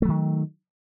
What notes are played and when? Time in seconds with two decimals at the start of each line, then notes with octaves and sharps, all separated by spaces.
0.02 A3
0.05 F#3
0.08 D#3